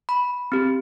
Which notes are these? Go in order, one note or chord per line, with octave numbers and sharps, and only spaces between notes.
B5
C4 G4